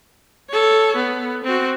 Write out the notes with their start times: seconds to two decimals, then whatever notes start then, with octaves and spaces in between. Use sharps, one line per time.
0.49 A4 C#5
0.96 B3
1.44 C4 F#4